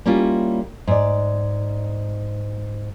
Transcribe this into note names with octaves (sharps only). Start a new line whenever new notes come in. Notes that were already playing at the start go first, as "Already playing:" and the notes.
G3 A#3 C#4 E4 F4
G#2 D5